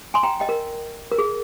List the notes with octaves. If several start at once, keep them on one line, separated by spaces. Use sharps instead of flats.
G#5 C6
G5 A#5
D#5 G5
A#4
A#4
G#4